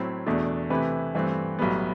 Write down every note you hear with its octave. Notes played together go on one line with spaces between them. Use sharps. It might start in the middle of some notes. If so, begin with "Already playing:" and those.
Already playing: A2 F#3 C4 E4
E2 B2 A3 D4
C3 E3 A3 E4 B4
G2 E3 A3 C4
B1 A2 G3 B3